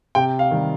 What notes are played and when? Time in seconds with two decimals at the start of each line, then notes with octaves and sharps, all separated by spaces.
0.15 C3 G5
0.39 F5
0.51 D#3 G3